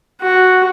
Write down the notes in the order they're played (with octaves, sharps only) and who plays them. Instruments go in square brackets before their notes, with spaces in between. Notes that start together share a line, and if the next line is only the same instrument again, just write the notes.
[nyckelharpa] F#4